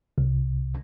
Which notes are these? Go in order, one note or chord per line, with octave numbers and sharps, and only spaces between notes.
C2